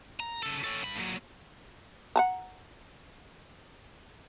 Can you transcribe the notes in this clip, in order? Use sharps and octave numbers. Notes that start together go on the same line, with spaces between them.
A#5
C#3 A4
C#4 A4
G2 B5
A#2 F#3
F#5 A5 A#5